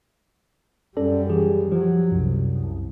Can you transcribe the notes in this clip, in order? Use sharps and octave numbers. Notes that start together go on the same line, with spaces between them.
F#2 G3 C#4 A4 D5
E3 G4 G#4
F3 F#3 F4 G4
C2 F#2